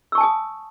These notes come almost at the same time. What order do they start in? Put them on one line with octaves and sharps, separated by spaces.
E6 C#6 A5 G#5 D#6